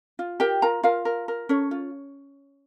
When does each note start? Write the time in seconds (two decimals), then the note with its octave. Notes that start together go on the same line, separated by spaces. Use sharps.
0.19 F4
0.40 G4 A#4 G5
0.62 F4 A#4 A#5
0.83 F4 A#4 F5
1.05 A#4
1.28 A#4
1.49 C#4 A4 C#5
1.71 F4